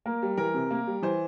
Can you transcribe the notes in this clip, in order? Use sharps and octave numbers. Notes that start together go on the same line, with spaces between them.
A#3 A#4
G3
E3 A#4
C3
A#3
G3
E3 C5